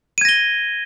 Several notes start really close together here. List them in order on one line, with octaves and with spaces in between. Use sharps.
D#7 G#6 A#6 G7